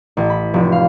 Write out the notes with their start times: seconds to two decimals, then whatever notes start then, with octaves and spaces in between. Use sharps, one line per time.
0.17 A1
0.30 B5
0.54 F1
0.72 F5